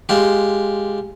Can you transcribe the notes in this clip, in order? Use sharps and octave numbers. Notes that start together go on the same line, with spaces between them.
G#3 F4 G4